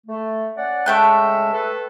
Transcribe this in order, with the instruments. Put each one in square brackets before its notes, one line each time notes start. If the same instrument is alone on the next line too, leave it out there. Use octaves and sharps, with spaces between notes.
[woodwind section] A3
C#4 D5 F#5
[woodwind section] C#3 G#3 E5 [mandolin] A3 G5 F#6
[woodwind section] A4 B4